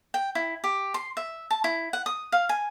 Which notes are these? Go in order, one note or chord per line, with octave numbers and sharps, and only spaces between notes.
G5
E4
G4
C6
E5
A5
E4
F#5
D#6
F5
G#5